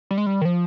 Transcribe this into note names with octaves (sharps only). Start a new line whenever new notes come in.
G3
G#3
G3
D#3
F3